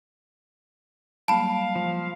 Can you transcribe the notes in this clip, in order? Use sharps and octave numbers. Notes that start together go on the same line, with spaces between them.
F#3 G3 A#3 F5 A5 B5
F3